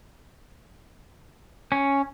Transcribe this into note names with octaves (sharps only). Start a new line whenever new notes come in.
C#4